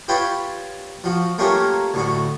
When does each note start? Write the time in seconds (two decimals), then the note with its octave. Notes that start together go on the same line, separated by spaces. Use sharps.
0.08 F4 G4 B4 C#5 G5 A5
1.04 F3 F#4
1.38 A3 A#3 C#4 F4 G4 A#4
1.94 D2 A2 F#4